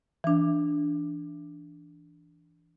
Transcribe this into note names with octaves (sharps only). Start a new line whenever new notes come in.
E3 D4